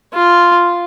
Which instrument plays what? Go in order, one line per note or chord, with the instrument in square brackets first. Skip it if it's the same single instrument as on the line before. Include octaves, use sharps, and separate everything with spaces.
[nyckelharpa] F4